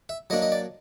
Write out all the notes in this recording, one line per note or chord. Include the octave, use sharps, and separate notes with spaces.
E5
F#3 A#3 D4 D#5
D#5
D5